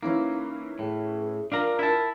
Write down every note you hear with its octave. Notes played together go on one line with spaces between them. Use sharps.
E3 A#3 C#4 D#4 E4
A2 G#4
D4 F4 A#4 F5 A#5
E4 A5